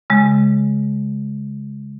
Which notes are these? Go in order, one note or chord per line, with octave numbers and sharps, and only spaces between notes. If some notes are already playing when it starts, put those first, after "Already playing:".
C#3 G#3